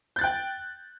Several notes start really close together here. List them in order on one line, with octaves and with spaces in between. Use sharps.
G6 A6 F#6 G5